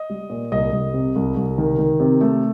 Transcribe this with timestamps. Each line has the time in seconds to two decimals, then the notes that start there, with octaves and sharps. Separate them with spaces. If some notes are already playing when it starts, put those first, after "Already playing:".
Already playing: D#5
0.10 G3
0.30 A#2
0.52 C2 D#5
0.72 C2
0.94 C3
1.16 C2
1.36 C2
1.58 D#3
1.78 D#3
2.00 C3
2.21 A3